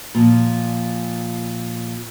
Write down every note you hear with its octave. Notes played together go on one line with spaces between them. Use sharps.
A#2 F3